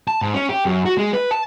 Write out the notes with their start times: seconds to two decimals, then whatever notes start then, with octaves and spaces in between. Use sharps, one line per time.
0.08 A5
0.22 G#2
0.34 C#4
0.49 G4
0.65 F#2
0.85 F#4
0.98 G#3
1.13 B4
1.31 A5